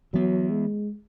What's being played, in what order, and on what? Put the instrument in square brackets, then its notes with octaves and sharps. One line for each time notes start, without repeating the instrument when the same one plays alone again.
[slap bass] E3 B3 [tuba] F#3
[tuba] G#3